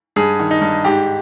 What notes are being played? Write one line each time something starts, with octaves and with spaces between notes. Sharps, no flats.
G2 G#4
D#3
D#4
G2
G#2 G4